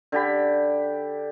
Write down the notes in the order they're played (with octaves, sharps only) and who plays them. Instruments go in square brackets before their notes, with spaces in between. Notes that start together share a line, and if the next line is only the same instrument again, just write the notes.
[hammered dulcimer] D3 G4 B5